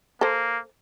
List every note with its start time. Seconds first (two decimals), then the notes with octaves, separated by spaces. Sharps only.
0.21 A#3 A4 C5